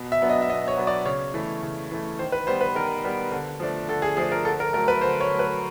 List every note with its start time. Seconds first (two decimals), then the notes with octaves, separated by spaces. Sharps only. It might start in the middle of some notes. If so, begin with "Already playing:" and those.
Already playing: B2
0.12 E5
0.21 F#3 B3 D4
0.30 D#5
0.42 E5
0.49 B2 D#5
0.68 C#5
0.77 F#3 B3 D4
0.87 D5
1.05 C#3 C#5
1.34 E3 A3
1.62 C#3
1.91 E3 A3
2.19 D#3 C5
2.32 B4
2.47 G3 B3 C5
2.61 B4
2.75 D#3 A#4
3.04 G3 B3
3.32 D3
3.60 F3 A3 D4
3.88 D3 A4
4.02 G#4
4.17 F3 A3 D4 G#4
4.32 A#4
4.45 D3 A4
4.60 A#4
4.73 F#3 A3 A#4
4.88 B4
5.01 D3 C5
5.21 C#5
5.30 F#3 A3
5.39 B4